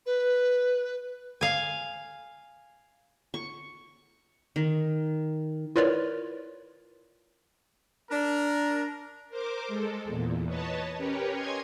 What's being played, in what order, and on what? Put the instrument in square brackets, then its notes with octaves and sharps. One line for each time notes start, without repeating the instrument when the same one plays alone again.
[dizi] B4
[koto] F5 G#5
[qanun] C#6
D#3
[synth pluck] E4 F4 A#4 B4 C#5 D5
[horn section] D4 A#4
[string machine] A#4 C5 D6
G#3 A4
E2 A#2
B4 C#5 D#5 A5
C#4 G4 A#4 B4 C#5
C#5 D#5 G#5 C6 G#6